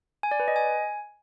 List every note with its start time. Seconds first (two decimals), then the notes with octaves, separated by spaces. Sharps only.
0.23 G#5
0.31 D5
0.40 B4
0.48 D#5
0.56 G#5